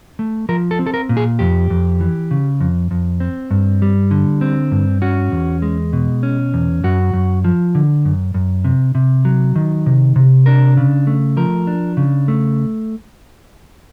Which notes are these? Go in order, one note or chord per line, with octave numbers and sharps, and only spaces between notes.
A3
F3 A#4
A4
C4
A4
A#4
A#2
G#4
F2 G4
F2
E3
C#3
F2
F2
C4
G2
G3
D3
C4
G2
C#4 F#4
E2
G#3
B2
C#4
E2
F#2 F#4
F#2
F3
D3
F#2
F#2
C3
C3
F#3
D#3
C3
C3
D4 A#4
C#3
A3
F3 A#4
D4
C#3
A3